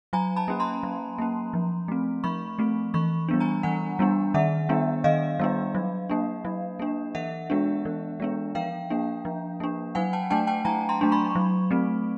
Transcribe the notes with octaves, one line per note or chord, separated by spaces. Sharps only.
F#3 G#5 A#5
A5 B5
A#3 C#4
A#5 C6
F#3
A#3 C#4
F3
A3 C4
F3 B5 C#6
A3 C4
E3 B5 C#6
G3 B3 D4
G#5 A#5
E3 F#5 G#5
G3 B3 D4
D#3 E5 F#5
G3 B3 D4
D#3 D#5 F5
G3 B3 D4
F#3
A#3 D4
F#3
A#3 D4
E3 E5 F#5
G#3 B3 D4
E3
G#3 B3 D4
F3 F5 G5
A#3 D4
F3
A#3 D4
F#3 F#5 G#5
G5 A5
A3 D4 G5 A5
G5 A5
F#3 G#5 A#5
A#5 C6
A3 D4
B5 C#6
F#3
A3 C4